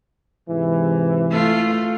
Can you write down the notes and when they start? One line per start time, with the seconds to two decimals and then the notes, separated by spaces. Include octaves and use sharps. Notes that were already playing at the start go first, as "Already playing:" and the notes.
0.49 G#2 C3 E3
1.31 A3 F4